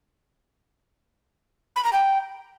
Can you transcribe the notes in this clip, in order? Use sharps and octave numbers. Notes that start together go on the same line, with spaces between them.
B5
A#5
G5